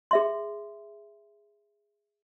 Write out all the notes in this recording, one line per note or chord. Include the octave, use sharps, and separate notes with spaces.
G#4 E5 C6